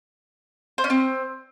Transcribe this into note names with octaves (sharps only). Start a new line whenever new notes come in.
C5
C#4
C4